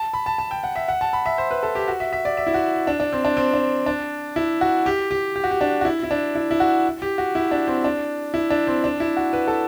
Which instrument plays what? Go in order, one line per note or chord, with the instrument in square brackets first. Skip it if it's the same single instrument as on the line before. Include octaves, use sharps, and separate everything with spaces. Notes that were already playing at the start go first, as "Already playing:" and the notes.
Already playing: [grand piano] A5
B5
A5
A5
G5
F#5
E5
F#5
A5
B5
E5
C5
B4
A4
G4
F#4
E5
E5
D5
E5
E4
F#4
D4
D4
C4
D4
C4
D4
D4
E4
F#4
G4
G4
G4
F#4
G4
D4
F#4
E4
E4
D4
E4
E4
F#4
G4
F#4
E4
D4
C4
D4
E4
D4
C4
D4
E4
F#4
B4
A4